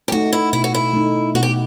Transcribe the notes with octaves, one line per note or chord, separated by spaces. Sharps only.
G4
A3 D#4 F#4
E4
B2 E4
F#4
E4
A3 D#4
B2 F#4
G4